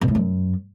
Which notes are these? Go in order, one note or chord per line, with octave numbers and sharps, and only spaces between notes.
B2
A2
F#2